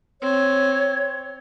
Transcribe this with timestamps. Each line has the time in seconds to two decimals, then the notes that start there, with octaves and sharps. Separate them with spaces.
0.22 C4 C#5